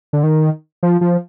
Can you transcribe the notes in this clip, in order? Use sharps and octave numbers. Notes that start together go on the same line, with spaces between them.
D3
D#3
F3
F3